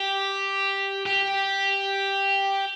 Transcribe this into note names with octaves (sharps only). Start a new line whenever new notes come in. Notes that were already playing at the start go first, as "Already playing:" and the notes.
Already playing: G4
G4